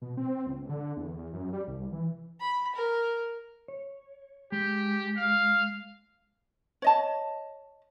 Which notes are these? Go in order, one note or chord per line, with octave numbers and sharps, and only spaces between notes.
B2
C4
C#2
D3
E2
F#2
G3
C2
E3
B5
A#4
C#5
G#3 G4
F5
C#5 D#5 A5